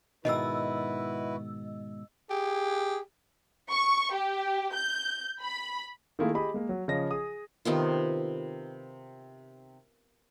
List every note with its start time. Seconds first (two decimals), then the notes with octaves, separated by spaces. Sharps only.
0.25 G#2 B2 D#3 E4 F#4 B4 D#5 E6
2.30 G4 G#4
3.70 C#6
4.13 G4
4.74 G6
5.42 B5
6.19 D#3 A3 A#3 E4 F4 G#4
6.34 G4 G#4 D#5 B5
6.54 G#3 A#3
6.69 F#3
6.88 C#3 F3 C#5 D#5 A#6
7.11 G#4 D#6
7.65 C3 D#3 B3 F4